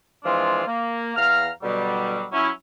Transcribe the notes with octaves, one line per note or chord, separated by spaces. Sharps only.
E3 F3 G#3 C4 D4 F4
A#3
E2 F5 A#5 F6
B2 D3 F#3 G3
F#3 C#4 E4